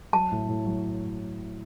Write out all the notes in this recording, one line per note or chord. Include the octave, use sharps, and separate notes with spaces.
F#3 A5
A2
A2
F#3